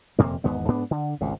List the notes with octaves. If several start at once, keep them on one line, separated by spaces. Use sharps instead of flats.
D#1 F2 C3 A#3
G#1 E2 G#2 B3
G#2 B3 D4
D3
G#1 C#2 C3